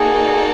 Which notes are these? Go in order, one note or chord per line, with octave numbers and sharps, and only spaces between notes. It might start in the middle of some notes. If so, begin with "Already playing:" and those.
Already playing: A#3 D#4 F#4 G#4 A4 D5